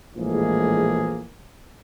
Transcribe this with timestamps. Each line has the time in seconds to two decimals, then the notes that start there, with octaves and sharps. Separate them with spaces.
0.16 A#1 A2 E3 G#3 A#3 G#4